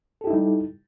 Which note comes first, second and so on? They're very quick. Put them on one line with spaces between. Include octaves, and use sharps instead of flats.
A4 G4 E4 D#4 G3